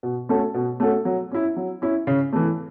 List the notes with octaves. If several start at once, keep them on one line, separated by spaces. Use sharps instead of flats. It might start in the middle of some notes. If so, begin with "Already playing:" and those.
B2
A3 C#4 F#4 A4
B2
A3 C#4 F#4 A4
F#3
C#4 E4
F#3
C#4 E4
C#3
E3 A3